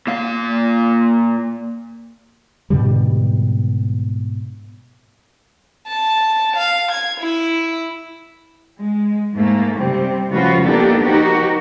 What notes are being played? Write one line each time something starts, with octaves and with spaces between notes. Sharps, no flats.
A#2 F5
G#2 B2 D3 G3
A5
F5
G#6
E4
G#3
G#2 A3 A#3
C3 G3 C4
C#3 F3 A3 F4 F#4 B4
A#3 B3 D4 D#4 G4 A4
F3 D#4 F#4 G4 A#4